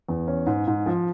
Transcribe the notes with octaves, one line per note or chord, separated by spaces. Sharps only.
E2
C#4
G#2
G#2
F3